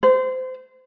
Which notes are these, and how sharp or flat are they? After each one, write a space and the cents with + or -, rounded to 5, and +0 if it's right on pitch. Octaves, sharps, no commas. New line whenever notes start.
C5 -25